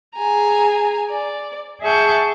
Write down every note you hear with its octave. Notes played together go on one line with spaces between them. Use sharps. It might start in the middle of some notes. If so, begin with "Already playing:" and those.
G#4 G#5 A#5
D5
G#4 E5 F#5 A5 C#6 G6